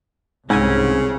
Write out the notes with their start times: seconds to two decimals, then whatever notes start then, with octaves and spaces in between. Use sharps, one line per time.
0.50 C2 G#2 C#3 C4 C#4 G#5